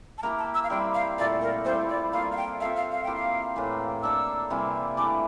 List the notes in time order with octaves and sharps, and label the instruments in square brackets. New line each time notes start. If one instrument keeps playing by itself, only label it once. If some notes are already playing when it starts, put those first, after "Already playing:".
[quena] A5
[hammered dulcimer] A#3 E4 G4 A#4 [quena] A#5
[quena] A5
E6
F5
[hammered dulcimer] G3 C4 E4 G4 [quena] G5
[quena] F5
[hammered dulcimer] A#2 A3 E4 A4 [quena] D5
[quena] A#4
[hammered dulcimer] G3 C4 E4 A4 [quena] C5
[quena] D5
[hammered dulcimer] A#3 F4 A4 [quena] F5
[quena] F5
G5
[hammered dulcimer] C4 F4 A4 E5 [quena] F5
[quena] F5
F5
[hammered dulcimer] A#3 E4 G4 C5 [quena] G5
[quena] F5
[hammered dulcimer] A2 E3 A#3
[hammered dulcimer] A#3 D4 A4 [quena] E6
[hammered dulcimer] C3 E3 G3 A#3
[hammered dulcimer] E3 A3 D4 [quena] D6